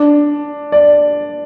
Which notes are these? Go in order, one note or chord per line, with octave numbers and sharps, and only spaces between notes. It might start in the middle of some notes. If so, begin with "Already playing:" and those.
Already playing: D4
D5